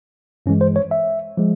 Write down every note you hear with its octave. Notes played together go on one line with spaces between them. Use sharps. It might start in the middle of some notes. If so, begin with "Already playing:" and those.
G2 E3 G#3 C#4
C5
C#5
E5
F3 G#3